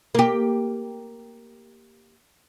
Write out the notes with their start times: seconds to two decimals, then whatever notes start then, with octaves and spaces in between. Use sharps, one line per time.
0.15 A#3 G4